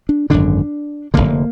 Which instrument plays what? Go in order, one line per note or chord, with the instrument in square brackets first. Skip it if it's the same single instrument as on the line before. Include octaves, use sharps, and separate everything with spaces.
[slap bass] D4
G#1 F#2 D3 D4
F1 F2 D3 A#3